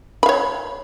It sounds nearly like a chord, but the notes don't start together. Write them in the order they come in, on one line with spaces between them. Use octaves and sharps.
B5 F5 C#5